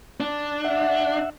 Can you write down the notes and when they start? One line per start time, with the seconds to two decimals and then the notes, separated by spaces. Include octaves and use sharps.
0.20 D4
0.65 E5 F#5